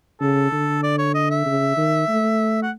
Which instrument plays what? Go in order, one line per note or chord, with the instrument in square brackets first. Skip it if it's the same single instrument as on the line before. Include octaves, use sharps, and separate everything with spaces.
[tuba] C#3 [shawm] A4
[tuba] D3
[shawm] D5
C#5
D#5
E5
[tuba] C#3
D#3
A3
[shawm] F#5